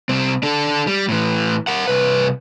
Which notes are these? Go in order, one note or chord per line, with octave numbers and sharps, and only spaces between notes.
C2 C4
D4 A4
G3
A2 E3
A#4 F#5
C2 B4